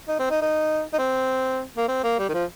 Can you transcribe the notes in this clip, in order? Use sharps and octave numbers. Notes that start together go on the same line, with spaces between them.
D#4
C4
D#4
D#4
D#4
C4
A#3
C4
A#3
G3
D#3
F3